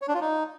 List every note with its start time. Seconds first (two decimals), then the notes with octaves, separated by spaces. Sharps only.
0.02 C#5
0.08 D4
0.14 F4
0.21 D#4